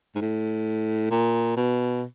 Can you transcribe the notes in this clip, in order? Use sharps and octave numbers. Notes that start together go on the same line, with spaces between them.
G#2
A2
A#2
B2